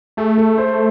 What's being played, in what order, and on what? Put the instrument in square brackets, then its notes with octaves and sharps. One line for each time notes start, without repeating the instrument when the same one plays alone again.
[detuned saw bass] A3 [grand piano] G#4
[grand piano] A4
C5